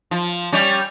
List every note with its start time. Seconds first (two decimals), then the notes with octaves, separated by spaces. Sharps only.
0.11 F3
0.53 G3 C#4